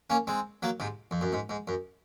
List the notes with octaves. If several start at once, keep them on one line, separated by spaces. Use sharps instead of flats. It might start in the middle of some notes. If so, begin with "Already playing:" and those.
A#3 C#4
G#3 C4
F#3 A#3
G#2 C3
F2
F#2
G#2
G#2
F#2